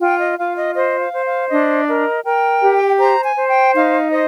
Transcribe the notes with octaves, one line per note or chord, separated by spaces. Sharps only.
F4 G5
D#5
F4 F5
D#5
C5 D#5
F5
C5
F5
D4 D#5
A#4 D#5
A#4 G5
G4
C5 A#5
G#5
C5
G5
D#4 F5
C5 D#5